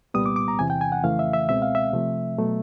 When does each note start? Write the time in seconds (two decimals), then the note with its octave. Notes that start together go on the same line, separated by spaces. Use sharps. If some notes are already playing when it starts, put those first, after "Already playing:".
0.14 C2 A#2 G3 B3 D#6
0.26 D6
0.36 D6
0.48 A#5
0.59 E2 C3 E3 G#5
0.70 G5
0.81 G#5
0.92 F#5
1.04 F2 C#3 E3 A3 F5
1.19 E5
1.33 E5
1.48 C#2 B2 G#3 C4 E5
1.62 F5
1.75 E5
1.93 C3 F3 A3
2.38 B2 F#3 A3